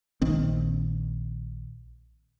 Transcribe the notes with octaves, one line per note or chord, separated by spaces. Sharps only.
A#1 D#3 C4